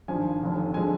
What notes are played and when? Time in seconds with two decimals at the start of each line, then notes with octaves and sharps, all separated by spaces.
0.08 G#1 G2 F3 G#5
0.41 F1 D#2 D3
0.74 D3 F3 G#3 G#5